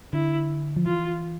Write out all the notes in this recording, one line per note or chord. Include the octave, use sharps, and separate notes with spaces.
D3 E4
F3
E3 F4